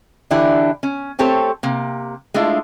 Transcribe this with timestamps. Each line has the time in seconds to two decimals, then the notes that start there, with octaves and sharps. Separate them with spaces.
0.31 D3 E3 D4 E4 G4 D5
0.83 C#4
1.19 A3 C4 G4 A4 C5 C#5
1.63 C3 A#3
2.34 G#3 A3 D4 E4 F4